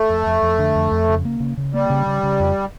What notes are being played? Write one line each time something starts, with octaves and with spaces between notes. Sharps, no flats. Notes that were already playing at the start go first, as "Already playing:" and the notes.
Already playing: A3
F2
F2
F2
D3
F2
F2
C#3
A#3
C#3
C#3
G3 A#3
C#3
C#3
C#3
F2